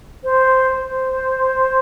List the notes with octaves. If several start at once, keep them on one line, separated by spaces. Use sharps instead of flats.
C5
C5